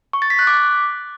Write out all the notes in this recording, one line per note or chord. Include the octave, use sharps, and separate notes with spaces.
C#6
A6
B6
F#6
D6